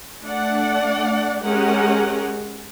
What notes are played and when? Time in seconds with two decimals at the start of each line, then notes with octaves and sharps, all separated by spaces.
0.24 A3 D4 D5 F#5
1.43 G#3 C#4 G4 G#4 A#4 F#5